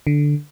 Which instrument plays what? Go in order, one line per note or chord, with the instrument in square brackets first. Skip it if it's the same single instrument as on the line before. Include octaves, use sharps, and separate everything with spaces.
[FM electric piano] D3